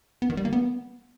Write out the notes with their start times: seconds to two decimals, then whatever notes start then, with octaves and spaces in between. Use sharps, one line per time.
0.22 B3
0.30 D#3
0.37 G3
0.45 A#3
0.53 B3